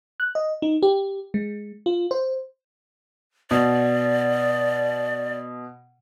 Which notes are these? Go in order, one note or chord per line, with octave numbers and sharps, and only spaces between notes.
F#6
D#5
D#4
G4
G#3
F4
C5
B2 D5